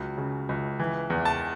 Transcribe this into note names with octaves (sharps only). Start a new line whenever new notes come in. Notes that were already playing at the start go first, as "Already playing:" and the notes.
Already playing: C#2 F#3
C#3
C#2
E3
E2
A5